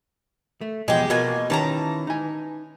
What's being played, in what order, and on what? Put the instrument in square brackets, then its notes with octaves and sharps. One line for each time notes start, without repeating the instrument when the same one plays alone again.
[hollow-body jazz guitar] A3
[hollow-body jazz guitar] E2 B2 F3 [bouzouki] G#3 G4
[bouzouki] B2 A#3 G#5 [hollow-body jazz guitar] F4 F#4
[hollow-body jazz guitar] D#3 C#4 G4 [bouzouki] E3 A5 A#5
[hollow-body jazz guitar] D#4 G#5